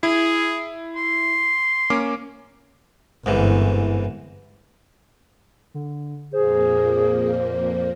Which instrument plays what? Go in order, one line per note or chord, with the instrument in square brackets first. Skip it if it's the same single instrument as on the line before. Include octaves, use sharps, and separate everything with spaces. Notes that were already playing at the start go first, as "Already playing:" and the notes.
[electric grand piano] E4 [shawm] G#4
[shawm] C6
[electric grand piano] A#3 C#4 D6
[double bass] G1 [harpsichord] C2 G#2 E3
[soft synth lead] D3
[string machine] F2 A#2 A#3 [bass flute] G#4 [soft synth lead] C5